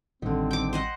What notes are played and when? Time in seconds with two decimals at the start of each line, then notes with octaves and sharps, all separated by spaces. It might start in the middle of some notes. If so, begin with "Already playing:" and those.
0.22 A1 D3 D#3 G3 C4
0.51 G5 D6
0.73 C5 D#5 F#5